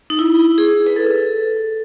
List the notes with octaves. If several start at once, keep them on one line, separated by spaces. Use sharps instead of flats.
D#4
E4
G#4
B4
A4